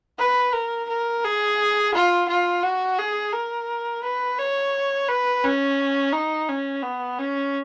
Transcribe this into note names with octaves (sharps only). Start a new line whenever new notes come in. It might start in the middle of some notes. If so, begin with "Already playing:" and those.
B4
A#4
A#4
G#4
F4
F4
F#4
G#4
A#4
B4
C#5
B4
C#4
D#4
C#4
B3
C#4